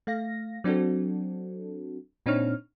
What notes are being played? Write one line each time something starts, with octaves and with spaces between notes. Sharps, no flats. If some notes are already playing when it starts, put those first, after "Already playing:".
A3 F5 A#6
F#3 C4 D4 F#4 A4
A#2 C4 D4 D#4 C#5 F6